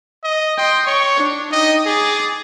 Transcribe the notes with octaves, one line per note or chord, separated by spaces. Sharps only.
D#5
D#5 G5 C6
C#5 C#6
D4
D#4 D#5 G5
G#4 D6 A6